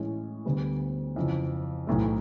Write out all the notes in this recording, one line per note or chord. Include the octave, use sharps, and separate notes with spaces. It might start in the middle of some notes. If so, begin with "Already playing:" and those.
Already playing: A2 E3 G#3 C#4
D2 D3 G3 B3
F2 C#3 E3
B1 A2 E3 A3